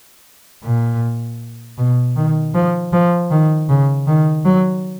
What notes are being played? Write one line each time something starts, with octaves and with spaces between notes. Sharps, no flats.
A#2
B2
D#3
F3
F3
D#3
C#3
D#3
F#3